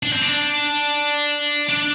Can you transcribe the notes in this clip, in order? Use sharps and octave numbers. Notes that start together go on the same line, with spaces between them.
D4
C4
D4
D4